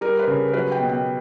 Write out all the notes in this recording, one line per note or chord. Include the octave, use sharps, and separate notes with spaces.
G3 A#4
B4
C#3
A#4
F#3 B4
G5
B2
G5